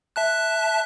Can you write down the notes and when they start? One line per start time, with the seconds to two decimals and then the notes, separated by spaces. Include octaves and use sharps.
0.16 E5 A5 F#6